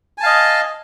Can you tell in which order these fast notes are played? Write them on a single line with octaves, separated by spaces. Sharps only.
G#5 A5 F5 D#5